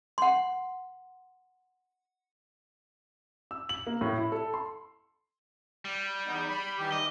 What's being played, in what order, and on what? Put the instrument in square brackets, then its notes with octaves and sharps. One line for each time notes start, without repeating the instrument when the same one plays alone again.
[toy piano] F#5 C6
[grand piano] E6
F#7
A#3
A2
E4
A4
C6
[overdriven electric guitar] G3
[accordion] E2 B3 D#4
B5
D#3 E3 G4
[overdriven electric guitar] D#5